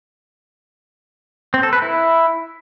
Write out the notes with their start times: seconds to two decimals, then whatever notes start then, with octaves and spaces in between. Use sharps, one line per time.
1.54 C4
1.63 A4
1.73 B4
1.82 E4